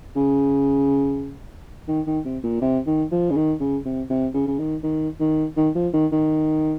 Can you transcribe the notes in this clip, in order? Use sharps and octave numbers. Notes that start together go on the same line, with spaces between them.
C#3
D#3
D#3
C3
A#2
C3
D#3
F3
C#3
D#3
C#3
C3
C3
C#3
C#3
D#3
D#3
D#3
D#3
F3
D#3
D#3